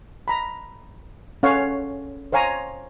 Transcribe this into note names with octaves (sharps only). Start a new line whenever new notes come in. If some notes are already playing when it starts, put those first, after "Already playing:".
A#5 B5
C#4 A4 C#5 F5 F#5 C#6
C5 C#5 F5 G#5 A#5